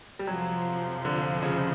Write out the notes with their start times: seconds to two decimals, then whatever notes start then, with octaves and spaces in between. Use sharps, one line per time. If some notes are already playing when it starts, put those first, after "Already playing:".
0.19 G3
0.27 F2 C3 F3 F#3
1.05 D3
1.43 C#3